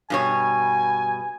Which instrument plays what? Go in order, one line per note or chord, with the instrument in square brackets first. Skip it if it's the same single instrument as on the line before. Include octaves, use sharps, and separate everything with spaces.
[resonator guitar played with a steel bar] G2 B2 C#5 [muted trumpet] G#5